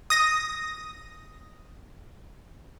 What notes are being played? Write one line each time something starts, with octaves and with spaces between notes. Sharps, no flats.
D#6 A#6